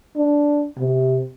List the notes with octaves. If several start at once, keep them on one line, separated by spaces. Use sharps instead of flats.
D4
C3